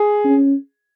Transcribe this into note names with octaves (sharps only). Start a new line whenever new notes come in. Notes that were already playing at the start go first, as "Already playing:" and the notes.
Already playing: G#4
C#4